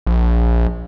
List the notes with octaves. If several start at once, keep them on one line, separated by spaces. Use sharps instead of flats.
A#1